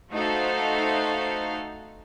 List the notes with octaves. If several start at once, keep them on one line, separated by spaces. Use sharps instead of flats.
A3 D#4 F#4 A4 C5 F5